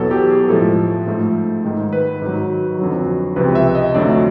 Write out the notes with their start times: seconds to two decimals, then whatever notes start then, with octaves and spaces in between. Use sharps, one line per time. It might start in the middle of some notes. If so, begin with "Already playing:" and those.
Already playing: E2 B2 F#3 A4
0.11 G4
0.30 G#4
0.49 A2 F3 G#3 A4
1.07 G#2 F3 A3
1.64 G#2 D#3 G#3
1.93 B4
2.22 G#2 D#3 F#3
2.79 F2 D3 F#3
3.36 C#2 C3 F3 B4
3.55 E5
3.75 D#5
3.94 F2 D3 F#3 A3 D5